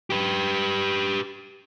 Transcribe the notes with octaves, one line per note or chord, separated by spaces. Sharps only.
G4 B4